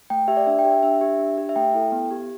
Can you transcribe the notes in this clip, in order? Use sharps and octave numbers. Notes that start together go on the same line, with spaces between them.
A3 G5
G4 E5
D5
D4 E5
G5
G4
E5
D4 E5
G4
D4
G4
E5
A3 G5
E4 A4
B3
G4